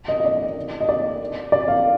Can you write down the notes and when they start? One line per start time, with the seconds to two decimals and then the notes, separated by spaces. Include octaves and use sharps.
0.08 D#5
0.20 D#5
0.25 D5
0.80 D#5
0.89 D5
1.52 D5
1.68 F5